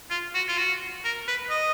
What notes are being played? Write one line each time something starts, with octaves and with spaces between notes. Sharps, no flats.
F4
F#4
F4
F#4
A#4
B4
D#5